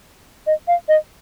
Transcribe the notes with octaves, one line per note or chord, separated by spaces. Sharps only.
D#5
F5
D#5